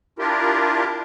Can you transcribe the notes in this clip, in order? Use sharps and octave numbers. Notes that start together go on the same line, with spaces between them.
D4 E4 F4 G4 A#4